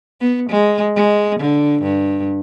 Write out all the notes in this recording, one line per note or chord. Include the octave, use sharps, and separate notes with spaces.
B3
G#3
G#3
D3
G2